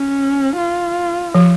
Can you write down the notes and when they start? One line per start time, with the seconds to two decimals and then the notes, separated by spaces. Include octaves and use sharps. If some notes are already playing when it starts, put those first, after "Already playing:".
Already playing: C#4
0.58 F4
1.35 F3